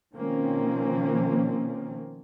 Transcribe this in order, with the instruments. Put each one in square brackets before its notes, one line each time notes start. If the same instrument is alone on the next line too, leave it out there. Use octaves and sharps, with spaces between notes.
[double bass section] B2 D#3 F3 A#3 C4 C#4